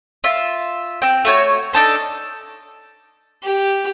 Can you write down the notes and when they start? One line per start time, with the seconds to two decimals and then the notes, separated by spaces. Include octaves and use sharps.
0.24 F4 E5
1.02 C4 G5
1.25 A3 F#4 C#5
1.73 D4 D#4 A4 C5
3.43 G4